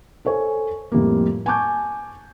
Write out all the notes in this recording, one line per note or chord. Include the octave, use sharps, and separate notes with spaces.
A4 C5 C#5 G#5
F2 A2 G3 A#3
G#5 A5 C#6 D6 G6